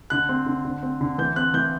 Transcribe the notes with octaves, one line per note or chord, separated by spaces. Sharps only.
D3 F#6
C4
D3
D3
C4
D3
E3 G6
C4 F#6
E3 G6